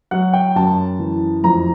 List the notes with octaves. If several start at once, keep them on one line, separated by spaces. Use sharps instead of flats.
F#3 F#5
G5
F#2 A5
E3
F2 A#5